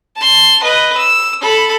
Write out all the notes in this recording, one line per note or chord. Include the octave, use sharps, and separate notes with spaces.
A5 C6
B4 D#5
E6
A4 B5